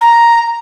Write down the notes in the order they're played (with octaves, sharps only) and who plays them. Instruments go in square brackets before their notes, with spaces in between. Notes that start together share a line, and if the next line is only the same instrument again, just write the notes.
[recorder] A#5